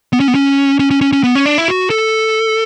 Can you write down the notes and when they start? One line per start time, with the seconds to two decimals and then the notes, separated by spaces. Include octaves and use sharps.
0.13 B3
0.20 C#4
0.28 B3
0.35 C#4
0.79 C#4
0.91 C#4
1.01 C#4
1.13 C#4
1.23 B3
1.35 C#4
1.46 D4
1.58 E4
1.68 F#4
1.90 A4